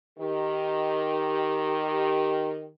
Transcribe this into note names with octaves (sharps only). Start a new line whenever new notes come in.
D#3 G4